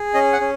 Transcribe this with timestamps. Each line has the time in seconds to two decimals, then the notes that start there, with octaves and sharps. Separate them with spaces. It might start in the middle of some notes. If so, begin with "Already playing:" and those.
Already playing: G#4
0.14 C#4 D#5
0.33 F#5
0.40 C#4